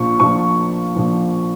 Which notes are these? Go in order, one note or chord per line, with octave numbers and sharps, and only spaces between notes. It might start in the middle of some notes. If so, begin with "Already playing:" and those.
Already playing: A#1 A#2 F3 C#6
A#1 A#2 F3 C#6
A#1 A#2 F3